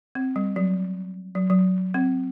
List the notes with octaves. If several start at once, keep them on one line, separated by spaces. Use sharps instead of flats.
C4
G3
F#3
F#3
F#3
C4